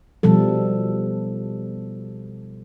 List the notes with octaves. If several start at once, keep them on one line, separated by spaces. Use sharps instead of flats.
B2 F3 G3 A4